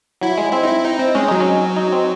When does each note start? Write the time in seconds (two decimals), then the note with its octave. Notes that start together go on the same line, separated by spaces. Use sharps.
0.21 F#3 E4
0.38 G#3
0.52 C4 E4
0.63 D#4
0.68 E4
0.85 D#4
0.99 C4
1.15 G#3 C#4
1.28 F#3 D#4
1.40 C#4
1.76 D#4
1.92 C4